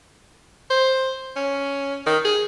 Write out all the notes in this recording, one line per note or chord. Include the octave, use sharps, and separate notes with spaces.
C5
C#4
D#3
G#4